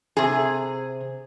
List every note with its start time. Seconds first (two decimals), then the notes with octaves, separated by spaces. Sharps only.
0.17 C3 G#4